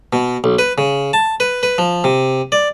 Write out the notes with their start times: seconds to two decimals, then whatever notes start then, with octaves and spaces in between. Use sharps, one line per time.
0.13 B2
0.44 B1
0.59 B4
0.78 C#3
1.13 A5
1.40 B4
1.63 B4
1.78 F3
2.04 C3
2.52 D5